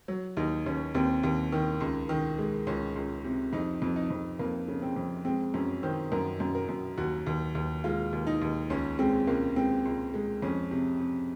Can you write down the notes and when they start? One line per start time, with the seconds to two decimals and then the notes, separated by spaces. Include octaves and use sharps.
0.08 F#3
0.37 D#2 D#4
0.66 D#2 C#4
0.95 D#2 C4
1.23 D#2
1.52 D#3
1.80 C#2
2.09 D#3
2.38 G#3
2.67 C#2 C#4
2.96 C#2
3.24 C3
3.53 F2 D#4
3.82 F2
3.96 D#4
4.10 F2
4.39 F2 A#3
4.68 C#3
4.82 C4
4.96 F2
5.25 G#3 C4
5.54 F#2 C#4
5.83 D#3 C5
6.12 F#2 A#4
6.40 F#2
6.55 A#4
6.69 F#2
6.97 D#2 F#4
7.26 D#2
7.55 D#2
7.84 G#3 F4
8.13 D#2
8.27 D#4
8.41 D#2
8.70 C#2 C#4
8.99 G#3 C4
9.27 C#2 A#3
9.56 G#3 C4
9.85 C#2
10.14 G#3
10.42 F2 C#4
10.71 C3
11.00 C3